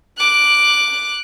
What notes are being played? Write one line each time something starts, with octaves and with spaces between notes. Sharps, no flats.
D6 F#6